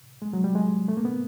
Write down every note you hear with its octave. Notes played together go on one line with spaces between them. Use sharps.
G#3
F#3
G3
G#3
A3
A#3
B3